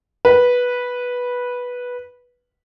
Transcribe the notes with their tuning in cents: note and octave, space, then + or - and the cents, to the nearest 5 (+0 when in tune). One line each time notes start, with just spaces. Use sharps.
B4 -10